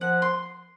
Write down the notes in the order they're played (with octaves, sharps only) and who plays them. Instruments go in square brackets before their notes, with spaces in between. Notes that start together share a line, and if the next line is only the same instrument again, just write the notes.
[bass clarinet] F3 [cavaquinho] F#5
[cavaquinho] C6